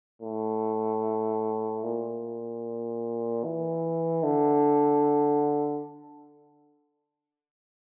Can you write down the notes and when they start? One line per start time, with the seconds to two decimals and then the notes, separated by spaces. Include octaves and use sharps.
0.22 A2
1.84 A#2
3.44 E3
4.24 D3